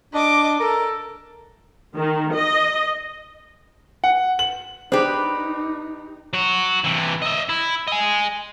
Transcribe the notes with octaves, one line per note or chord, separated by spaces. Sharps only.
D4 D#5 D6
A4 A#4
D#3
D#5
F#5
F#7
D4 D#4 G4 G#4 B4 C5
F#3 F#4
C3 E3
D#5 E5
E4
D#5 G#5